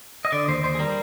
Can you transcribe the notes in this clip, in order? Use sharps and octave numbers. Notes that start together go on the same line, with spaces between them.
D#5
D3 D5
D#2 C5
D#2 C5
G#4
G3 A#4